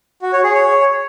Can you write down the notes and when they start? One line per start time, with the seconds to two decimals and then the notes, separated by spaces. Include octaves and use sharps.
0.22 F#4
0.33 C#5
0.44 G#4
0.55 C#5